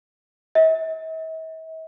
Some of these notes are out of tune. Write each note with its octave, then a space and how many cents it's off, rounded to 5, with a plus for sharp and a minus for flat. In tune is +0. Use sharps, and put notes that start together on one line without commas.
E5 -45